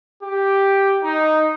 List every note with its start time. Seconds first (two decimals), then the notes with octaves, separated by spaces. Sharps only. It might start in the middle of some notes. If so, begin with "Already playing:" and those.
0.23 G4
1.04 D#4